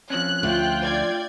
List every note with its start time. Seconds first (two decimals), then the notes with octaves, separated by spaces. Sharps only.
0.10 F3 C4 C#4 F#6
0.43 D2 F4 G5
0.83 D5 G#6